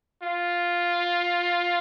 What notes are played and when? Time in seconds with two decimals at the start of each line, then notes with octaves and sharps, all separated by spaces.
0.23 F4